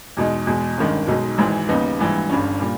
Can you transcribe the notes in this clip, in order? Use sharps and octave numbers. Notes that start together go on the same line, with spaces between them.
E2 B2 G#3 D#4
E2 B2 G#3
G1 G2 D#3 G#3 C#4
B1 B2 G#3 D#4
G#1 G#2 E3 G#3
D#2 C#3 G3 B3 D#4
A#1 G#2 E3 G3
G1 G2 G3 C#4
A#2 G3